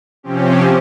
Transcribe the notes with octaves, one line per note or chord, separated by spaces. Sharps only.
C3 F3 C4 C#4 G4